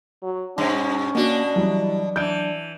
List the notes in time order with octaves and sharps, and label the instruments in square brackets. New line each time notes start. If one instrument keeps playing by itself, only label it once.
[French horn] F#3
[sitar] G2 B2 [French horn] C#4
[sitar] B2 D4 [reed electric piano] A#3 F#4
[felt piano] E3 G3 F#4 [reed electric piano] F#3
[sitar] E3 [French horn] D4 [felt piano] G6 D7